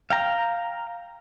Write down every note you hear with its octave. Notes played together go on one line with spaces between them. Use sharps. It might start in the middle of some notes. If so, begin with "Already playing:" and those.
F5 G5 A#5